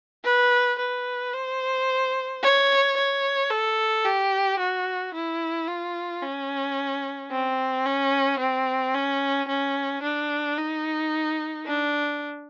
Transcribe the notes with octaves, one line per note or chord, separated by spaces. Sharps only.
B4
B4
C5
C#5
C#5
A4
G4
F#4
E4
F4
C#4
C4
C#4
C4
C#4
C#4
D4
D#4
D4